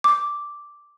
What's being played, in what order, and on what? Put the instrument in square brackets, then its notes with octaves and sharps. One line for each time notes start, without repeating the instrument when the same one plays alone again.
[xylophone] D6